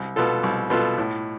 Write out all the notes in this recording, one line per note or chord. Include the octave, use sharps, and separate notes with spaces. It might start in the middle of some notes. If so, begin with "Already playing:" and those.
Already playing: C2
B2 B3 F4 A4
C2
B2 B3 F4 A4
A2